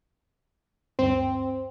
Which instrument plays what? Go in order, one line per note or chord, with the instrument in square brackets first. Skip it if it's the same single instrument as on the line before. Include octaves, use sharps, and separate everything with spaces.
[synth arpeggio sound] D2 G2 [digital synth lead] C4